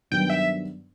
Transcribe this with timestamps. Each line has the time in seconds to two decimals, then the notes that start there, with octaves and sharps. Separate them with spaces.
0.11 G2 D#3 F#3 B3 G5
0.30 E5